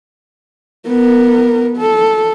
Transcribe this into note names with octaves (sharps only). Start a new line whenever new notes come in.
B3 A#4
A4